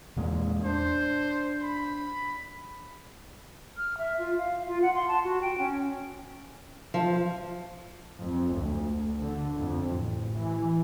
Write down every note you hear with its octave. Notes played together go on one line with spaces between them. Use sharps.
E2 A#2 G#3
D4 C5
B5
F6
E5
F4
F5
F4
F#5
C6
A5
F#4
G5
C#4
F3
F2
D2
D3
F2
A1
E3